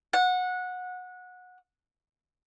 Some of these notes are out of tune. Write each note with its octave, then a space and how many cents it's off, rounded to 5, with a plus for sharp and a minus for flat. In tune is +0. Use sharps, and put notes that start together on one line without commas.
F#5 -20